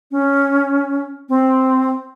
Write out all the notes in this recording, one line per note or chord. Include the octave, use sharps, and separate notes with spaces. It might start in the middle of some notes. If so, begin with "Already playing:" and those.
C#4
C4